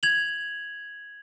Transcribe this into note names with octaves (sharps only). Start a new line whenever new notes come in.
G#6 F7 F#7